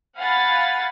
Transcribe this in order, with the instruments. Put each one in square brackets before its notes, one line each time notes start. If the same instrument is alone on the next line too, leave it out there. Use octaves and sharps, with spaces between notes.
[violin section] F5 F#5 G#5 B5 A6